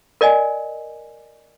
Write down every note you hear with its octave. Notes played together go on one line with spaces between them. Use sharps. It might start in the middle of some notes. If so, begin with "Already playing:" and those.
A#4 D5 D#5 G#5